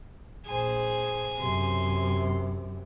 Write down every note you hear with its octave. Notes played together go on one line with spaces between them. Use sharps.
A#1 G#4 C5 G#5
F#2 C3 C6